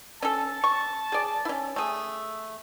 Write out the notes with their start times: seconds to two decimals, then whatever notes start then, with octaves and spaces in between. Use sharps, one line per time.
0.22 C#4 A4 A5
0.64 C#6
1.12 G#4 D5
1.45 C#4 E4
1.76 A3 G#4